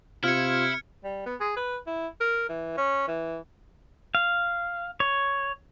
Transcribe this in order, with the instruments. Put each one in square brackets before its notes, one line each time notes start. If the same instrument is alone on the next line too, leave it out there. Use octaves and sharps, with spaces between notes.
[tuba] C3 [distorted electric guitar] E4 [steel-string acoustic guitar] F4 [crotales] F6 G#6 C#7
[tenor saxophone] G3
B3
G#4
B4
E4
A#4
E3
C#4
E3
[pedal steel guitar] F5
C#5